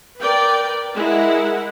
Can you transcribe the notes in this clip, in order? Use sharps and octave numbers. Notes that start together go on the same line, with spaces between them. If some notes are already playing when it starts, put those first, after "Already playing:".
A#4 B4 D5 G5
G#3 E4 A#4 F#5